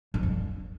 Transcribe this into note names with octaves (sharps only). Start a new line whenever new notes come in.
F2
G2